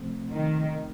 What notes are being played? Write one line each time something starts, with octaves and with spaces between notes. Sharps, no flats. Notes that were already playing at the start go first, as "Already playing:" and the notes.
Already playing: C3 F3 A3 C4
D#3